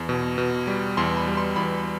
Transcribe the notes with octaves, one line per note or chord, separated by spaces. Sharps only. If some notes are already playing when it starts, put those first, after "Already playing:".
Already playing: E2
B2
B2
G3
E2 C6
B5
G3
C6
E2 B5